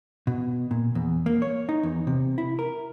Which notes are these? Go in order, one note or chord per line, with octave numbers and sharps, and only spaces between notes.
B2
A#2
E2
A#3
C#5
D#4
E2
C3
E4
A#4